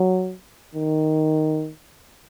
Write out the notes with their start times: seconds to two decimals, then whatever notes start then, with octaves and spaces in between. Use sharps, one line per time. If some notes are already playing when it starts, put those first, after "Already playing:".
Already playing: F#3
0.75 D#3